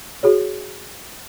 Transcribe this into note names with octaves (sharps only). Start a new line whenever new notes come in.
F#4 G#4 C#5